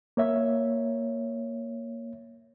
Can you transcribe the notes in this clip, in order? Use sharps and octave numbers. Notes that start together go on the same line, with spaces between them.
A#3 C#5 E5